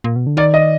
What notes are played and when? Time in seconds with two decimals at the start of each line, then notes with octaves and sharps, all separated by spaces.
0.04 A#2
0.16 B2
0.27 D3
0.37 D#3 D5
0.54 D#5